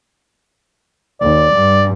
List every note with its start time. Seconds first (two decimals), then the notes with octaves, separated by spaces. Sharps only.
1.21 D#2 D5
1.54 G2